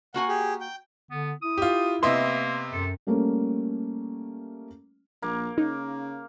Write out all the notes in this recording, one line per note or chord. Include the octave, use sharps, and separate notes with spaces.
A#3 F#4 F#5 G#5
G4 G#4
G5
D3 B3
E4 D#6
F4 G4
C3 A#3 B3 D#5 E5 C6
F#2 A4
G3 A3 A#3 C#4
A#1 A#3
C#3 D#4